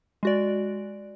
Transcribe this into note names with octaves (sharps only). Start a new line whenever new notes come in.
G#3 F#4 D5